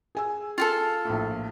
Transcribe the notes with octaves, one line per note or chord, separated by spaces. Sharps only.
G#4 G#5 E6
F4 G4 A4
A#1 A2